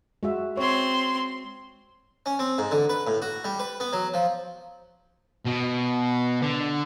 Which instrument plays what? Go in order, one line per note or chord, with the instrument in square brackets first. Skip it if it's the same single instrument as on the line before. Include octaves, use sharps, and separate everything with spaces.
[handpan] G#3 F#4 E5
[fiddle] C4 C6 [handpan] C#5
[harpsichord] C#4
C4
G#2
D3
B4
A2
F#4
G3
B4
B3
F#3
F3
[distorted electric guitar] B2
D3